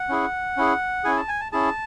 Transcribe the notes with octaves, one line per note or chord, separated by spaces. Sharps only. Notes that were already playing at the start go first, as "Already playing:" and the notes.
Already playing: F#5
C#4 E4 G#4
C#4 E4 G#4
C#4 E4 G#4 G#5
A5
G#5
A5
C#4 E4 G#4 A5